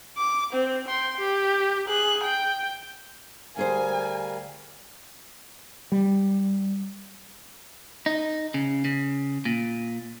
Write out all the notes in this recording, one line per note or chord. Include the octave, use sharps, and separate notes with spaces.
D6
C4
G5 C6
G4
G#4 F#6
G5
D2 G3 G#4 A#4 C5 F5 G#5
G3
D#4
C#3
C#3
A#2